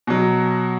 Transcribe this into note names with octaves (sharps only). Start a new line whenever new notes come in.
B2 F#3